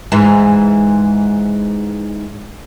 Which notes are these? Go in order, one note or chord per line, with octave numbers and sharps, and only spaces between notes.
G#2 E3